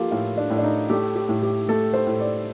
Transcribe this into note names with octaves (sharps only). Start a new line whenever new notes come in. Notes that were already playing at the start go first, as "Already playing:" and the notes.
Already playing: F3 A#3 F4 G4 A4
A2 F4
D4
A2
D4
D#4
A3 G4
G4
A2
G4
A3 A4
C5
A2
D5